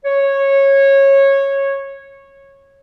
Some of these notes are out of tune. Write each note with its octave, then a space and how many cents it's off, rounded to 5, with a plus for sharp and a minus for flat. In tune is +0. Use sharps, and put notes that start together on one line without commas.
C#5 -15